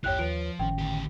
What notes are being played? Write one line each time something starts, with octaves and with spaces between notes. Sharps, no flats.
A1 E2 G2 E3 G4 C#5 G5 F#6
D#2 F3 F4 B4 C#5 D7
G#1 A2 D#3 C#4 G5
D2 G4